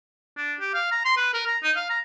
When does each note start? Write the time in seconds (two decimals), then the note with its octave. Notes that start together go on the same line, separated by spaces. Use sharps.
0.37 D4
0.60 G4
0.74 F5
0.92 A#5
1.05 C6
1.17 B4
1.34 A#4
1.47 A#5
1.63 D#4
1.76 F5
1.90 A#5